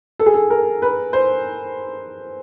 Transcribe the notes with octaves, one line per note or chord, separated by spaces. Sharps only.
A4
G#4
A4
A#4
B4
C5